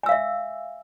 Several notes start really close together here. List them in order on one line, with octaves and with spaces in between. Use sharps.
G#5 E6 F5 E5